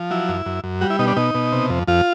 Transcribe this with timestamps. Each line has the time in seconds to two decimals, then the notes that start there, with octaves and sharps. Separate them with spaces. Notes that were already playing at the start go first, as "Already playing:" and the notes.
Already playing: F3
0.11 F#3 E4
0.29 F#2
0.46 F#2
0.64 F#2
0.81 G3 F#4
0.90 E4
0.99 B2 D#4
1.07 D4
1.16 B2 D#4
1.34 B2
1.52 C3
1.70 F2
1.87 F2 F4